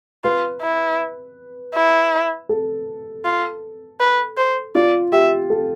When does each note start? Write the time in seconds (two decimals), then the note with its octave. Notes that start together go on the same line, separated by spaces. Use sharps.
0.24 F4 B4
0.62 E4
1.75 E4
2.49 A4
3.25 F4
4.00 B4
4.37 C5
4.75 F4 D5
5.12 G4 E5
5.50 A4